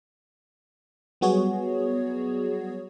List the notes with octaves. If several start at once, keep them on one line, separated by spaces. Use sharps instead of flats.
F#3 G3 B3 F#4 G#4 C#5